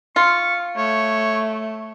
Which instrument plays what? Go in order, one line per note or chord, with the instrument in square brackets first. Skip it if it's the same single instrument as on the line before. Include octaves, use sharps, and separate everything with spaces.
[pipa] F4 [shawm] C#6
[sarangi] A3 [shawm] C#5